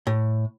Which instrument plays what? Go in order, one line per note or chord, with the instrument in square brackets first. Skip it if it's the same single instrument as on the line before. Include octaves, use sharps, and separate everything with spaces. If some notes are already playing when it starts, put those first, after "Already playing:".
[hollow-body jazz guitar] A2